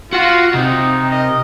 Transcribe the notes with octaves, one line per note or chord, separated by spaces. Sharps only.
F4 F#4 F#5
C3 D#4
A#4 D#5